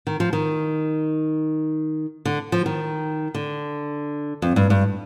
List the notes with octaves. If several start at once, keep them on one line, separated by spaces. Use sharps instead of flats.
D#3
F3
D#3
D3
F3
D#3
D3
F2
G2
G2